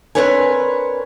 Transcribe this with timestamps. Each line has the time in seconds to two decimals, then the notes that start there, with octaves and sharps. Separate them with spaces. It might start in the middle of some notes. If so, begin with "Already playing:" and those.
0.15 C4 D4 A#4 B4 C#5 G#5